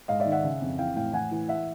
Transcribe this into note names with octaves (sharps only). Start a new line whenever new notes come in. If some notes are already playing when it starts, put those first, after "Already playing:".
G#2 D#5 F5
D5 E5
D#3
E5 F#5
C#3
F2
E3 F5 G5
A2 F5 G5
E3 F#5 G#5
E3
E5 F#5